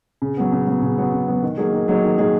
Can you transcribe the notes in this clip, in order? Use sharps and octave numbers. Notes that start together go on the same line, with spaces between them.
C#3
F#3 B3
C#3
F#3 B3
C#3
F#3 B3
C#3
F#3 B3
D#3
F#3 A#3 D#4 G#4
D#3
F#3 A#3 D#4 G#4
D#3
F#3 A#3 D#4 G#4